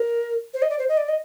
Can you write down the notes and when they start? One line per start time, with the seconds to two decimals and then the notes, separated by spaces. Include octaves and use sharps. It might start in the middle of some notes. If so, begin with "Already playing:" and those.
Already playing: A#4
0.53 C5
0.62 D#5
0.69 D5
0.78 C5
0.88 D#5
0.97 D5
1.08 D#5